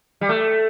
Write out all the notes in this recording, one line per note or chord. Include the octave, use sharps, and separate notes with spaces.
G3
A3